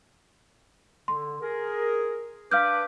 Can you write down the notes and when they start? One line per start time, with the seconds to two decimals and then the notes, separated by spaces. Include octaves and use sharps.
1.08 D3 C6
1.41 G#4 A#4
2.51 D4 B4 F5 D6 F6 G6